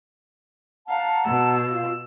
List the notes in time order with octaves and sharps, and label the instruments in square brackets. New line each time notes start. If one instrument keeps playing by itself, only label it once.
[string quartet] F5 [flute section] F#5 A5 A#5
[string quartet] B2 E6
[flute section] F4 F5